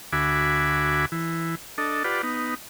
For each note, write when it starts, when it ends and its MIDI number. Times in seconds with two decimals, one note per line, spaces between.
0.13 1.05 38
0.13 1.05 66
0.13 1.05 76
0.13 1.05 80
0.13 1.05 83
0.13 1.05 86
1.12 1.55 52
1.78 2.03 62
1.78 2.03 69
1.78 2.03 75
2.04 2.22 65
2.04 2.22 67
2.04 2.22 71
2.04 2.22 74
2.04 2.22 78
2.23 2.55 59
2.23 2.55 63